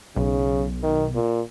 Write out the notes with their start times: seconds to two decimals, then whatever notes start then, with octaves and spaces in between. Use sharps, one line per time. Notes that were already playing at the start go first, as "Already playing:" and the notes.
0.16 B1 C#3
0.83 D#3
1.15 A#2